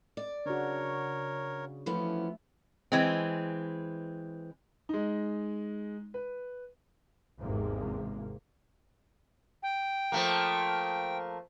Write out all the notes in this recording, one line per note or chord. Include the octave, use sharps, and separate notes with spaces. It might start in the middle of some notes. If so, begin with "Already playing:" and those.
D5
C#3 D4 F#4 A#4 C#5
E3 F3 A3 B3 C#4
E3 G#3 C4
G#3 D#4
B4
G#1 E2 G#2 C3 A#3
G5
F3 A3 A#3